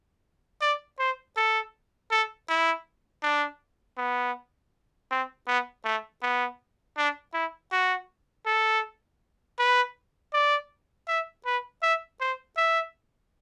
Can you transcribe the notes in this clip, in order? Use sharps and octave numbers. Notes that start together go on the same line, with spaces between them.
D5
C5
A4
A4
E4
D4
B3
C4
B3
A3
B3
D4
E4
F#4
A4
B4
D5
E5
B4
E5
C5
E5